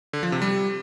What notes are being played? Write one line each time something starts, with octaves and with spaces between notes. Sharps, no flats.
D3
F3
C3
G3